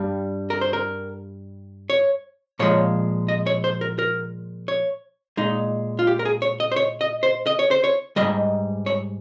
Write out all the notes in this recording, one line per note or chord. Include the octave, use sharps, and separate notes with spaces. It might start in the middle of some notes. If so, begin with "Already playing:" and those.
Already playing: G2 G3
A#4
C5
A#4
C#5
A#2 F3 G#3 C#5
D#5
C#5
C5
A#4
A#4
C#5
A#2 G#3 D#4
F4
G4
A#4
G#4
C#5
D#5
C5
C#5
D#5
C5
D#5
C#5
C5
C#5
G#2 D#3 G3 D#5
C#5